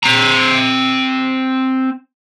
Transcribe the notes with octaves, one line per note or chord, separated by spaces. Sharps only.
C4 A#5